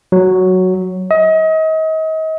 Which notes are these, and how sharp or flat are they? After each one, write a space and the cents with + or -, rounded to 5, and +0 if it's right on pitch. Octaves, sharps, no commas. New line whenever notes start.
F#3 +0
D#5 +35